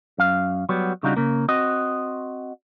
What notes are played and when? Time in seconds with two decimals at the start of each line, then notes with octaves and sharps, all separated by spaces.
0.18 F#2 F5
0.69 F#3 G3 B3
1.03 C#3 G3 D4 D#4 F4 F#4
1.17 C#3 A#3
1.48 C4 F#4 D#5